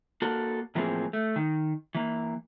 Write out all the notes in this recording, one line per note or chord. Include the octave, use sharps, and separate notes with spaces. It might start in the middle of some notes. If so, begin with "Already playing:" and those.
A#3 F#4 A4
A2 E3 F3 A#3 C4 G#4
A3
D#3
E3 A#3